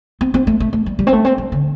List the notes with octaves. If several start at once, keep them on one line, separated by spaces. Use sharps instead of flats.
C4
C4
A3
A3
A3
G3
G3
C4
A3
C4
G3
D3